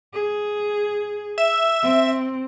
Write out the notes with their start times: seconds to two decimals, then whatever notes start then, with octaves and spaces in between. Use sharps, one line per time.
0.13 G#4
1.38 E5
1.82 C4